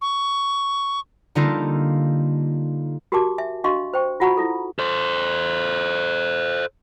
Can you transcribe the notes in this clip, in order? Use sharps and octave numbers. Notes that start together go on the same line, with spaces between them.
C#6
D3 G3 A#3 D#4 F4 A4
F#4 G4 A#4 G#5 A5 D6
E5 G#5
D4 F#4 D#5 F5 C6 C#6
C5 G5 C#6
F4 F#4 F#5 A#5 B5 C#6
E4 F4 A4
A4 C5